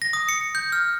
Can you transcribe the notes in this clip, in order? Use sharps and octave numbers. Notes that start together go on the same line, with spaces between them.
A#6
D#6
C#7
G6
F6